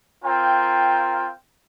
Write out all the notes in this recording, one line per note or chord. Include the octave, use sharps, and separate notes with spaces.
C4 F4 A#4 G5